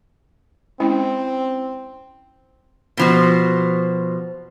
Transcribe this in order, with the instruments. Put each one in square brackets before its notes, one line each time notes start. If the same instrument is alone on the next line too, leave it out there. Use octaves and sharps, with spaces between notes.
[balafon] G#3 C#4 E4 [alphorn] C4
[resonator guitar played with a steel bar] B2 F3 F#4